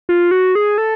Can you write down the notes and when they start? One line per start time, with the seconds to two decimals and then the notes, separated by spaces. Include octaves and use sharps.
0.09 F4
0.31 F#4
0.55 G#4
0.78 A4